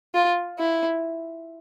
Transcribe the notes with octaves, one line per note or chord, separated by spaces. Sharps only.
F4
E4